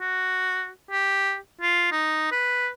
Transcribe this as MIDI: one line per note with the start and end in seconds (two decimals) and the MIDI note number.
0.01 0.68 66
0.91 1.36 67
1.61 1.88 65
1.92 2.31 63
2.32 2.69 71